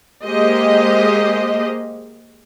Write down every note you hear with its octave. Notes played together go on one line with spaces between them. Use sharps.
G#3 A#3 G4 C5 D#5